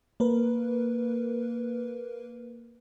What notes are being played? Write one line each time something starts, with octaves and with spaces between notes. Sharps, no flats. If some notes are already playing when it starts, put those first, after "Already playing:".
A#3 A#4 B4